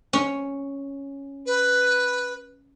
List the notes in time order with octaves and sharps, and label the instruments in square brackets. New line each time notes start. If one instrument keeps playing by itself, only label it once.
[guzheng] C#4
[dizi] B4